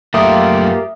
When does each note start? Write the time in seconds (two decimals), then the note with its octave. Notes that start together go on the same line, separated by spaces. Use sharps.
0.14 F#2 A3 A#3 F4 G4 E5 D#6